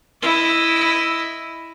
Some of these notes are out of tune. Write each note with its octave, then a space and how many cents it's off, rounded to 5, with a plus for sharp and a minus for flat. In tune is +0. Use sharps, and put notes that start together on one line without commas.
E4 +0 D#5 +0